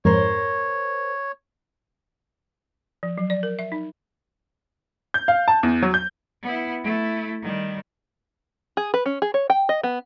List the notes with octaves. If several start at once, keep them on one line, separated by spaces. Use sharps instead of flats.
F2 G#2 A#4 C5 C#5
F3
F#3
D5
A#4
E5
D#4
G6
F5
A5
E2
F#3
G6
B3 E4
A3 E4
D#3 G3
G#4
B4
C#4
G#4
C#5
G5
D#5
B3